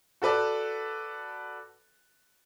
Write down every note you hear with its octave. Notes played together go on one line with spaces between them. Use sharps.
F#4 A4 B4 D5 A5